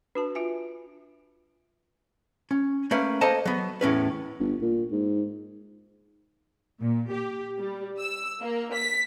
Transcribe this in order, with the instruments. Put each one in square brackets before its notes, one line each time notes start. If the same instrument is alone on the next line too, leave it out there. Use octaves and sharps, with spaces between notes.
[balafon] D4 F#4 A5 [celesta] B4
[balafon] F4 E5 G#5
[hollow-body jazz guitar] C#4
A3 A#3 C#4 B4
A#3 A4 C5 D#5 A5 A#5
F#3 B3
E2 A2 C#4 B4
[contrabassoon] G1
A#2
G#2
[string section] A#2
G4
G3
E6
A#3
B6